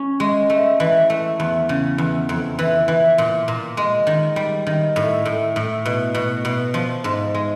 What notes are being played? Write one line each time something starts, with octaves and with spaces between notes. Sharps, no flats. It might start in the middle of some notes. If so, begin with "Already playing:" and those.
Already playing: C#4
G#3
A3
E3
A3
E2
C#3
E2
F2
E3
E3
A#2
A#2
G#3
D#3
G3
D#3
A2
A2
A2
B2
B2
B2
F3
G#2
G#3